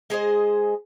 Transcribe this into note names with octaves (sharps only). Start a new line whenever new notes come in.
G#3 G#4 C5 D#5